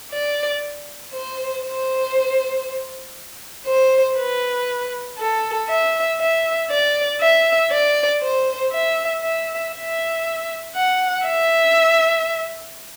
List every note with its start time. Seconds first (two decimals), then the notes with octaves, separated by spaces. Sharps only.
0.12 D5
1.12 C5
1.64 C5
3.66 C5
4.17 B4
5.18 A4
5.69 E5
6.19 E5
6.70 D5
7.21 E5
7.71 D5
8.22 C5
8.72 E5
9.23 E5
9.74 E5
10.75 F#5
11.26 E5